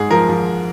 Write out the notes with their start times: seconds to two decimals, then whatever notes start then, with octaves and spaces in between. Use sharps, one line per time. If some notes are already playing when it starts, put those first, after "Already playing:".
Already playing: G#2 G#3 G#4
0.11 F3 A#4
0.29 F3